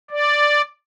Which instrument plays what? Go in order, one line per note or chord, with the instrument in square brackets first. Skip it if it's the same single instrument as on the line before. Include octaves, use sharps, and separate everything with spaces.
[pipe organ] D5